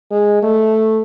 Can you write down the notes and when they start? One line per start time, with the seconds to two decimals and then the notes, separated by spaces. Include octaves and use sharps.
0.11 G#3
0.43 A3